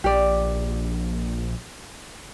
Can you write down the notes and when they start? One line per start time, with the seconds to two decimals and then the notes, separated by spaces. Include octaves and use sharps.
0.04 A#1 G4 D5